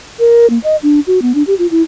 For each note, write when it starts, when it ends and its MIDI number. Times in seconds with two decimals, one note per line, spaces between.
0.19 0.47 70
0.50 0.59 58
0.64 0.76 75
0.83 1.00 62
1.07 1.22 66
1.22 1.33 59
1.35 1.43 62
1.47 1.54 67
1.59 1.67 65
1.71 1.82 64